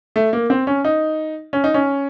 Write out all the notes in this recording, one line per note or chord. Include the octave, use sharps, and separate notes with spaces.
A3
A#3
C4
C#4
D#4
C#4
D#4
C#4